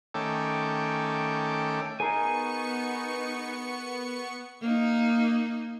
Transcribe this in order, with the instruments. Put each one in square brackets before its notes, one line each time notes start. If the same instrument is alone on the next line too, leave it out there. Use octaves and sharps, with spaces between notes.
[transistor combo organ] D#3 A3 C#4 A4 G5 D6
[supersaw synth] B3 C#6 C#7 [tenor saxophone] D#4 [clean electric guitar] G#4 A#4 [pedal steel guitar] G#5
[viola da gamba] A#3 D#4